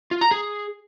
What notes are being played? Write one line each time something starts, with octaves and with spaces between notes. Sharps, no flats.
F4
A#5
G#4